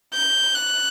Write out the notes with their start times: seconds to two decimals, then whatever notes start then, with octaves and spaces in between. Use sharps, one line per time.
0.14 G6
0.54 F#6